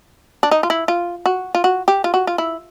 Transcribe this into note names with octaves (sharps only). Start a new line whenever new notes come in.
D4
D#4
F4
E4
F4
F#4
F4
F#4
G4
F4
F#4
F4
E4